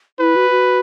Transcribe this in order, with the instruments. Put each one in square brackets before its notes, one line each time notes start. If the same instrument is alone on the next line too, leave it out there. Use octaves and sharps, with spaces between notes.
[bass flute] E4 [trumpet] B4
[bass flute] F#4
F#4